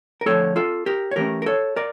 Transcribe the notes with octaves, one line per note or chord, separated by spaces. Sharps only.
A#4
D3 F3 A3 A4 C#5
F4 A4
G4 A#4
C#5
E3 A3 C#4 G4 A#4
A#4
A4 C#5
A#4 D5